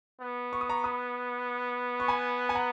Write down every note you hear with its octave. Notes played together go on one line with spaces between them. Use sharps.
B3
C#6
D#6
A#5 C#6
B5 D#6
C#6
G#5 B5
G#5
F#5 A#5